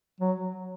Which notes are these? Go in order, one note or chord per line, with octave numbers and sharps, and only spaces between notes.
F#3